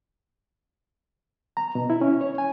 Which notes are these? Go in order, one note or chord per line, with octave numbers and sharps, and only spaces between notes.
A#5
B2
E4
C#4
C#5
G#5